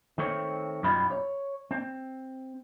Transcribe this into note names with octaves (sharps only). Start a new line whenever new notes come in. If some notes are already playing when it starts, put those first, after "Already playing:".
D#3 A3 C4 C#5
F#2 B2 G3 D#4 F4 B5
C#5
C4